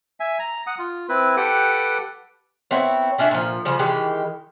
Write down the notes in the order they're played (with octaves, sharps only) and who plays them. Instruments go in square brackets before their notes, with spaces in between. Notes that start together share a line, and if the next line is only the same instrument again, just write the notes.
[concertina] E5 G#5
A#5
F#5 D#6
F4
C4 E4 B4
G4 A4 B4 F#5 G5
[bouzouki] B3 C4 E4 C#5
A3 C#4 D4 E5
A#2 F3
C#3 F3 G3
D#3 E3 G#3 G4